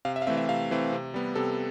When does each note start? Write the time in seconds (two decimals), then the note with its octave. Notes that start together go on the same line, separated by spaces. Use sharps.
0.05 C3 F5
0.16 E5
0.22 F5
0.27 E3 A3 C4 E5
0.37 E5
0.48 C3 F5
0.71 E3 A3 C4
0.92 C3
1.14 G3 B3
1.35 C3 A4